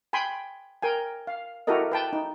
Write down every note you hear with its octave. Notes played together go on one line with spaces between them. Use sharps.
G5 G#5 B5 C6
A#4 G5 G#5
F5
E4 F#4 G4 A4 A#4 D#5
B4 G5 A5
D#4